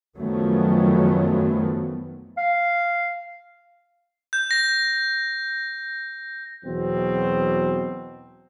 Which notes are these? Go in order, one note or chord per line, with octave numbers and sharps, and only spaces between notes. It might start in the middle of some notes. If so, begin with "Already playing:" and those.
F#2 D#3 F3 F#3 A3 B3
F5
G6
A#6
E2 B2 F#3 C4